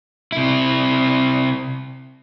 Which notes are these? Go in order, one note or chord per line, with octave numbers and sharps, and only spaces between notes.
C3 E4